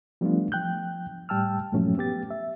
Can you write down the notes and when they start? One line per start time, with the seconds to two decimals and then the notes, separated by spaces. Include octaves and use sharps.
0.21 F3 G3 A3 B3 D4 F4
0.52 F3 G5 F#6 G6
1.29 A2 G3 G5 A5 E6 F6
1.72 G2 A#2 F3 F#3 A3 C#4
1.98 B3 G4 A6
2.30 E5